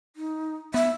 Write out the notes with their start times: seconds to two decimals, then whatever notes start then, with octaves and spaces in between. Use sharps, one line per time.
0.16 D#4
0.74 B3 E5